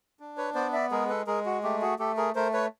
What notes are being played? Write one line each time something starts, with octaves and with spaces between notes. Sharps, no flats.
D4
B4 C#5
B3 C5 D5
D5 E5
G#3 G#4 A#4
A4 B4
G#3 G#4 A#4
F#4
A3 G4
F#4 G#4
A3 G4 A4
G#4 A#4
A3 A#4 C5
B4 C#5